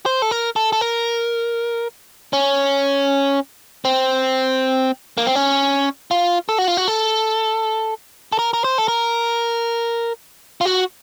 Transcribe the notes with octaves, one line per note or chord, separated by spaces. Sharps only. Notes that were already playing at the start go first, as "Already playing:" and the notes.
C5
A4
A#4
A4
A4
A#4
C#4
C4
A#3
C4
C#4
F4
A4
F#4
F4
F#4
A4
A4
A#4
A#4
C5
A4
A#4
F4
F#4